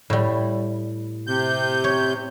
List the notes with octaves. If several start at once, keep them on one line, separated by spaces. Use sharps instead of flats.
A2 G3
C3 G6
C#5